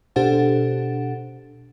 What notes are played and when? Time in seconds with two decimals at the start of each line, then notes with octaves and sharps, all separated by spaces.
0.16 B2 D4 G4 A4 C5 F#5